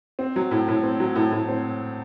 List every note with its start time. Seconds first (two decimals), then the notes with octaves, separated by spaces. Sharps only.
0.19 C4
0.36 F#3
0.51 A2
0.68 A2
0.84 C4
1.00 F#3
1.15 A2
1.32 A2
1.49 C4